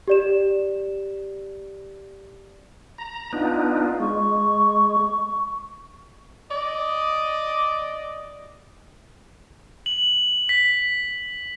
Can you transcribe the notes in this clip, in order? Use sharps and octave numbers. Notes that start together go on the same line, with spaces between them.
G4 D5 E7
A#5
B3 D4 D#4 F4
G#3 C#6
D5 D#5
F#7
B6